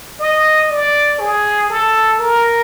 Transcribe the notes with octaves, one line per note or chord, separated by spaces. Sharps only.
D#5
D5
G#4
A4
A#4